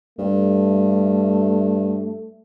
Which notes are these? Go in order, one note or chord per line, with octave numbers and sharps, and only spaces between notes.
G2 A3